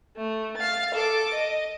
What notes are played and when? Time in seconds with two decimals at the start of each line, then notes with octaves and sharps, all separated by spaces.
0.16 A3
0.57 F5 A6
0.94 A4 D6
1.34 D#5